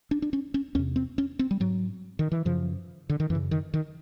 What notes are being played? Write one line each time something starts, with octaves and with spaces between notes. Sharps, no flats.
D4
D4
C#4
C#4
E2 C3 C#4
C4
C#4
C4
G3
G#2 F#3
D#3
E3
F#2 C#3 F3
D3
D#3
F#2 C#3 E3
D#3
D#3